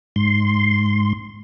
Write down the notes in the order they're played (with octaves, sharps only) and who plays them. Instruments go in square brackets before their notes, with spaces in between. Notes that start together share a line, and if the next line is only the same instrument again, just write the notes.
[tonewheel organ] G#2 C6